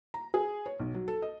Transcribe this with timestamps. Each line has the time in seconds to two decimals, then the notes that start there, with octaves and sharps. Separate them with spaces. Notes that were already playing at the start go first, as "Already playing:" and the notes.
0.14 A#5
0.34 G#4
0.66 C#5
0.79 B1
0.94 F#3
1.08 A4
1.22 D#5